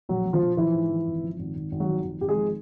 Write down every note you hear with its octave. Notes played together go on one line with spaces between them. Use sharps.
A#1 F#3 F#4
A#1
F3 F4
A#1
E3 F3 E4
G#2
F3
G#1
F3
G#1
G#1
G#1
F#3 F#4
F3
G#1
G#1 G4
G#3 G#4
F3